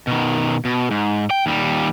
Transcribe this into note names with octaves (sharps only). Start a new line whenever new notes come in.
B2 D#3
B2
G#2
G5
D#2 G3